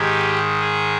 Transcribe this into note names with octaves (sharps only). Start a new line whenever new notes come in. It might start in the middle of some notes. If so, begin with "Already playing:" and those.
Already playing: G#2 D#3 G#3 G4
G#4